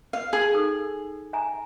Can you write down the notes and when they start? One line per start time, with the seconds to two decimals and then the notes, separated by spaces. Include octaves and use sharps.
0.13 F5
0.33 G#4 G#5 E6
0.54 D#4 A4 E6
1.33 E5 G#5 A#5